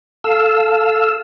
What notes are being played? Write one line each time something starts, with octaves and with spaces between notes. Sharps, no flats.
A4 F5 E6